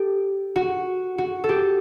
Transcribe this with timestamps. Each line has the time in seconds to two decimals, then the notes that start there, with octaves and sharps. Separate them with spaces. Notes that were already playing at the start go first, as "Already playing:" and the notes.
Already playing: G4 A4
0.56 F#4
1.18 F#4
1.44 A4
1.49 G4